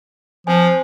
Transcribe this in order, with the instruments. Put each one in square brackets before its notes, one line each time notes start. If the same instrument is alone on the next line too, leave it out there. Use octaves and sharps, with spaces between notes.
[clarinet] F3 [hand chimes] C4 C5 G#5